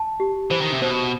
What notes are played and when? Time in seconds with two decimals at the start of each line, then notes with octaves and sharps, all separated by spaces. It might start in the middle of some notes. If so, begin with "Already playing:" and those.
Already playing: A5
0.20 G4
0.51 E3 C5
0.61 D#3
0.72 C3
0.82 B2 C5